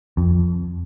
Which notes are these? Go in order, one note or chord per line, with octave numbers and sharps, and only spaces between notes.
F2